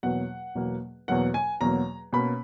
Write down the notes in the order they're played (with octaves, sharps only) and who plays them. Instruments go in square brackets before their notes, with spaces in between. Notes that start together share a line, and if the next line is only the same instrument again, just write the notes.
[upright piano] E2 B2 F#3 A#3 F#5
E2 B2 F#3 A#3
E2 B2 F#3 A#3 F#5
G#5
E2 B2 F#3 A#3 A#5
B2 A#3 C#4 B5